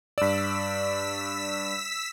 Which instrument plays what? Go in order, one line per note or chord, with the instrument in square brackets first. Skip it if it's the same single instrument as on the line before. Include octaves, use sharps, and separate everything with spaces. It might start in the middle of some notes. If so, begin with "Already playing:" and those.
[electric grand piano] G2 D5 [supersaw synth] E6 B6